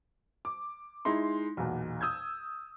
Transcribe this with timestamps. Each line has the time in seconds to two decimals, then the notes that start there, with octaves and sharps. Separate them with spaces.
0.45 D6
1.05 G#3 D#4 E4 C6
1.57 B1 E2 A#2
2.01 D#6 E6 G6 G#6